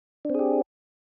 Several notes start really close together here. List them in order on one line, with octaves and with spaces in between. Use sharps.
D4 C4 G#4 G4